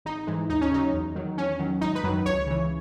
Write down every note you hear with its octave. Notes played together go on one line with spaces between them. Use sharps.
G#1 D#4
G#2 E3 G#3
D#2 D#4
C#4
C#3 F#3 D#4
E2
D#3 F#3
E2 C#4
D#3 F#3
G#1 D#4
B4
F#2 D#3 F#3
C#2 C#5
C#3 E3